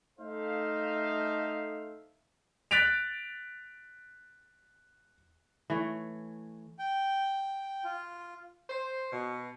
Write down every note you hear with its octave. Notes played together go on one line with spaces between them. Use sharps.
A3 D#4 A4 C5 E5 F5
F#6 A6 B6 D7 F7
E3 A3 C#5
G5
F4
C5
B2